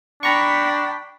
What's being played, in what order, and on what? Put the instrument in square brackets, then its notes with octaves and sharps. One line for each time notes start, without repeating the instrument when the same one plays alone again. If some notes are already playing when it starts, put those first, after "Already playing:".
[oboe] D4 [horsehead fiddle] G5 B5 [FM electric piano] A#5 C#6